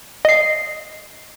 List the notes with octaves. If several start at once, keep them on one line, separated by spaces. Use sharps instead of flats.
D#5 C7